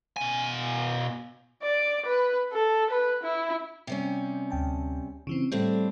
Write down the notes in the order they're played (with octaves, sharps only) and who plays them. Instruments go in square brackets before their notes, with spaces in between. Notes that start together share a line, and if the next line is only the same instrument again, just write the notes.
[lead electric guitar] B2 G#5
[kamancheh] D5
B4
A4
B4
E4
[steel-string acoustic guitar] C3 G3 C#4
[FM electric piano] D2 G5 A5
C#3 E3 C4
[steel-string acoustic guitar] A2 C4 D4 [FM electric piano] G3 A4